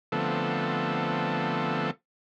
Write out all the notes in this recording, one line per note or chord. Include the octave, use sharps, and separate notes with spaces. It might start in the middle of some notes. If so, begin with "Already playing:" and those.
D3 F3 A3 B3 C4 A4